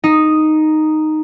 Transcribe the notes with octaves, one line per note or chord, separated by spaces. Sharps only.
D#4